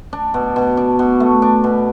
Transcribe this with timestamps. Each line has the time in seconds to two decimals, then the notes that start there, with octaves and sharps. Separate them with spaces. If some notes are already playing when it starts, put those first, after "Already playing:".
0.13 D4
0.34 B2
0.56 B2
0.77 D4
0.99 B2
1.20 A3
1.42 D4
1.64 B2